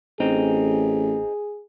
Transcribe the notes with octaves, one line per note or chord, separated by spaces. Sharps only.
A1 C4 D#4 G#4